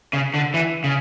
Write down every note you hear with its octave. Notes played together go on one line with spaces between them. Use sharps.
C#3
D3
E3
C#3